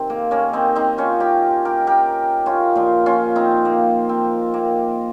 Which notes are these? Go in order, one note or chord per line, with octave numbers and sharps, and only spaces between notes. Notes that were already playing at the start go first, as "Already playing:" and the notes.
Already playing: C3 D#3 C4
A#3
A#3 C#4
C4 D#4
C4 D#4
C#4 F4
D#4 G4
G4 A#4
G4 A#4
C#4 F4
A#2 F3
C#4 F4
C4 D#4
A#3
C4
A#3